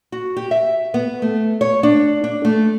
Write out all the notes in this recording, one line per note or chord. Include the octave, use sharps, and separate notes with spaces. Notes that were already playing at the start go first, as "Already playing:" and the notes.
F#4
G4
E5
B3
A3
C#5
D4
D4
A3